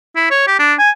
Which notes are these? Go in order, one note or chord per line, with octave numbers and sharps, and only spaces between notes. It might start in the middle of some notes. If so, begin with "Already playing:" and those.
E4
C#5
G4
D4
G#5